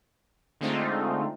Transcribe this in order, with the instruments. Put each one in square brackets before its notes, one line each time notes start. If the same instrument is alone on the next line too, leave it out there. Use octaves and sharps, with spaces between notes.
[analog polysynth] D3 G#3 A3 C4 D#4 F4